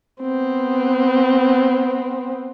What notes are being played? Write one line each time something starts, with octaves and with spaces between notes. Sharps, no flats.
B3 C4